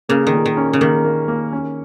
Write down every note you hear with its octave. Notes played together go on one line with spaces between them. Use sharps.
C#3 A#3
D#3
A#2
D#3
C#4
C#3
D#3 A#3
A#3
A#3
C#4